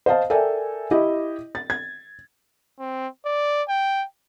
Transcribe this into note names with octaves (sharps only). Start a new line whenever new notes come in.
C5 D#5 F5 A5
A4 A#4 D5 E5 G5 G#5
E4 G4 D#5
A6
G#6
C4
D5
G5